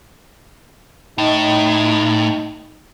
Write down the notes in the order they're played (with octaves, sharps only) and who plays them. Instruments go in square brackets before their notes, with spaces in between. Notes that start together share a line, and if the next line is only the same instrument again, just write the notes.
[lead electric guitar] A2 [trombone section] D#4